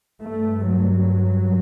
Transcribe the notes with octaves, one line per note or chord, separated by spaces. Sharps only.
G2 A3
F#3